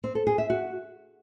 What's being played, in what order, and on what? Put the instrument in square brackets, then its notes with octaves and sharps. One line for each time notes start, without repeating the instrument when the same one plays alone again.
[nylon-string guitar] C4
A4
G#4
E5
F#4